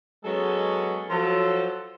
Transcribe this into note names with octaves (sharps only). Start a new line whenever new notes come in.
F#3 G#3 B3 C#4 G#4 A4
F3 F#3 A4